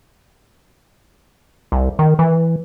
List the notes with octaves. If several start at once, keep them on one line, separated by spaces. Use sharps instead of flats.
C2
D#3
E3